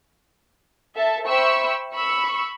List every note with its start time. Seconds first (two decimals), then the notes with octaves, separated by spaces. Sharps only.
0.96 A4 E5 A5
1.27 C5 E5 G5 B5 C#6 E6
1.93 B5 C#6 E6